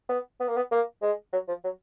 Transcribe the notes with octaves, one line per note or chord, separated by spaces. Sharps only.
B3
B3
A#3
B3
A#3
G#3
F#3
F3
F#3